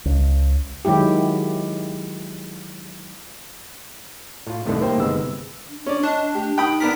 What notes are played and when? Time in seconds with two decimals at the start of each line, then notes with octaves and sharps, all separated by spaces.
0.05 C#2
0.85 D#3 F#3 G#3 E4 G4
4.47 A2 F4
4.66 C2 A2 C3 D#3 A3
4.81 A#3 C5 G5
4.98 G1 C3 D#3 G#3 B3 E6
5.70 D4
5.86 C#4 D5
6.03 D4 D#5
6.35 A3 G4
6.58 D#4 G5 B5 D#6
6.80 B3 D4 A#4 B6